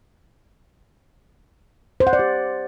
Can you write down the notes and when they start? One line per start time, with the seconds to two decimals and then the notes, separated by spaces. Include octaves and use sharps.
2.00 C5
2.07 F#5
2.13 D5
2.19 G4